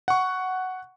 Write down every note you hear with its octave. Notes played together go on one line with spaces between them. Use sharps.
F#5 C#6